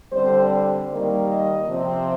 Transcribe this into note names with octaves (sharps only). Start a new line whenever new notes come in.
D3 G3 C4 C5
D#3 G3 A#3
D#5
C3 F3 C4